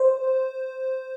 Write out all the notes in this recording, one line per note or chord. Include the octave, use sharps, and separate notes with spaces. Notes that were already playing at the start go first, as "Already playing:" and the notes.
Already playing: C5